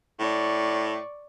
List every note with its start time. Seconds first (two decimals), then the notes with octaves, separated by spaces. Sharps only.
0.20 A2 D5 C#6